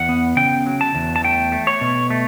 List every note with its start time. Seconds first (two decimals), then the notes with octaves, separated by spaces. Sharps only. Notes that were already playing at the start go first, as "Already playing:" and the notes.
Already playing: E2 F#5
0.09 B3
0.37 C#3 G5
0.66 F#3
0.81 A5
0.95 E2
1.16 A5
1.24 A3 G5
1.52 A3
1.67 C#5
1.81 B2
2.10 A3